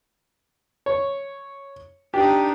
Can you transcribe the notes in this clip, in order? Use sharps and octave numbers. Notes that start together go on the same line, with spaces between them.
C#5
D4 D#4 G4